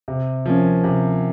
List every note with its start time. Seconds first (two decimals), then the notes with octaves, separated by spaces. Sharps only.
0.08 C3
0.46 F3 A#3 C#4
0.84 C3